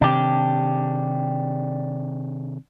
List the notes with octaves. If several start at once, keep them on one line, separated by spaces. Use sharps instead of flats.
C3 D#3 C4 D4 G4